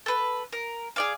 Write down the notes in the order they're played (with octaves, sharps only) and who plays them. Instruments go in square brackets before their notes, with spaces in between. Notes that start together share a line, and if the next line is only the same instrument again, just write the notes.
[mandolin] A4 B4
A#4
G#4 D5 F5